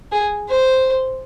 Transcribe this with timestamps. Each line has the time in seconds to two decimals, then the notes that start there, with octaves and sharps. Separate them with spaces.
0.12 G#4
0.48 C5